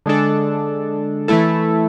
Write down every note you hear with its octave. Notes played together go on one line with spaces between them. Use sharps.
D3 G#3 D4 A4
E3 A3 E4 A4